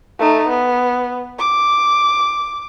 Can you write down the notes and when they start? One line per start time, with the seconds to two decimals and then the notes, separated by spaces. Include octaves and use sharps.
0.19 A3 D#4
0.48 B3
1.39 D6